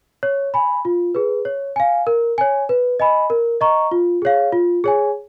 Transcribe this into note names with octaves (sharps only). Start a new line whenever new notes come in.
C#5
G#5 B5
F4
G#4 B4
C#5
F5 G#5
A#4
C#5 G#5
B4
D#5 G#5 B5
A#4
D#5 A#5 C#6
F4
G#4 C#5 F5
F4
G#4 C#5 G#5